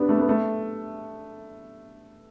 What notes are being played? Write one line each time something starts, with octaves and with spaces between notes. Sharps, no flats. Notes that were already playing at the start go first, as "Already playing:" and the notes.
Already playing: B3 D4 G4
A3
B3
A3